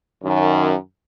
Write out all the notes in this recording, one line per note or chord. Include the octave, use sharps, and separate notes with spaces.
F#2 D#3